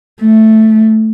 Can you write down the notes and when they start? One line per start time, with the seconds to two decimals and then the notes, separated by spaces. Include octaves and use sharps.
0.21 A3